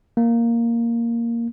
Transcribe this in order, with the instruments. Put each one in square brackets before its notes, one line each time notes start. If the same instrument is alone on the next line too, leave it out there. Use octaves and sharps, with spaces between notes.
[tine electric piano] A#3